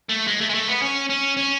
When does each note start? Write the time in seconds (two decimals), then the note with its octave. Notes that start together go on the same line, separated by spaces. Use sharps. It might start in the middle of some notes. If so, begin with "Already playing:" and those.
0.09 A3
0.27 G#3
0.41 A3
0.49 G#3
0.54 A3
0.68 B3
0.82 C#4
1.09 C#4
1.37 C#4